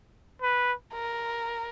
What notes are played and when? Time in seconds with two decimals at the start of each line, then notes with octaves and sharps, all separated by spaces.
0.42 B4
0.93 A#4